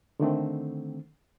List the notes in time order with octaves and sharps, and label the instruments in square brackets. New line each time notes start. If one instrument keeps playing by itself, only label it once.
[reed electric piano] D3 D#3 A3 C4